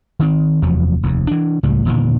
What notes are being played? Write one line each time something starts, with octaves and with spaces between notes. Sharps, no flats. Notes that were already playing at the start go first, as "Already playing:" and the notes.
D#3 C4
F1 E2 F3 F#3
F1 D#2
E3 D4
C#2 A2 C#3 G3
E1 A#2 D3 D#3